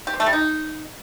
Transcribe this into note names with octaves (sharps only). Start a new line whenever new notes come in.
G4
C4
A3
G3
D#4